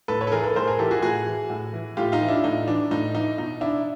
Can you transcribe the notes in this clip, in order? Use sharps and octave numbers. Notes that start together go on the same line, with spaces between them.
A2 A4 B4
B4 C#5
A4
E3 G#4 A#4
A4 B4
A2 A#4 C5
G#4 A#4
E3 G4 A4
F#4 G#4
A2 F#4 G#4
E3
A2
E3
A2 F4 G4
D#4 F4
E3
D4 E4
A2 D#4
E3 D4
A2 D#4
E3 D#4
B2 D#4
D4 E4